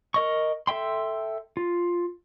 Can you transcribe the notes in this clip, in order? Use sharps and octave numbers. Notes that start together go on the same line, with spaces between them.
A#4 D#5 C#6
A4 E5 G5 C6
F4